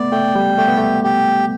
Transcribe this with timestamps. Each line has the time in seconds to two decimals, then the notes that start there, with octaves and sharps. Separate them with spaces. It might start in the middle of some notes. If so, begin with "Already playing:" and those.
Already playing: A3 B3 D5
0.12 A3 G5
0.35 G3
0.58 A3 G4
0.68 B3
0.78 A3
1.04 G4